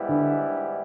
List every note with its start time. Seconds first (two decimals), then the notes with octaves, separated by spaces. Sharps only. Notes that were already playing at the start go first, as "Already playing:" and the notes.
Already playing: G#2 E3 G3 B3 E4
0.09 D3